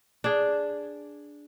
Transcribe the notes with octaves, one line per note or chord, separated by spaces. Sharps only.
D4 G#4